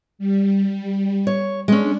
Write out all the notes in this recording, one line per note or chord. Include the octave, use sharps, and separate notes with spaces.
G3
C#5
G#3 C#4 D4